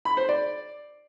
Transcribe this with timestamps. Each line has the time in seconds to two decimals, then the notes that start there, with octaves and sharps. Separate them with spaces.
0.05 B5
0.17 C5
0.29 D5